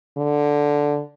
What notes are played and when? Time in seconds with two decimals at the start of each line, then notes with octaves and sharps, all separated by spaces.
0.17 D3